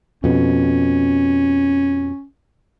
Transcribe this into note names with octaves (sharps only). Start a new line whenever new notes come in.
F2 B2 C#4